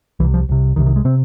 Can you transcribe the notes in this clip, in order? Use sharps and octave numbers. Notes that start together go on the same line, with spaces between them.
C2 C3 E3
F3
C2 C3
C2 C3 D#3
D#3
G#3
C3 C4